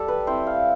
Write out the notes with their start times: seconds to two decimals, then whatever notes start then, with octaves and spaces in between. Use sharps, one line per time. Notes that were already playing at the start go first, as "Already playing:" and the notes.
Already playing: G3 A4
0.08 B4
0.27 C4 E4 C5
0.47 F5